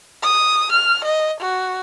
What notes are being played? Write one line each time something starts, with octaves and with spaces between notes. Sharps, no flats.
D#6
F6
D#5
F#4